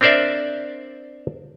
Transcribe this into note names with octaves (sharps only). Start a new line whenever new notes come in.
C4 D4 A#4 C5 D5 E5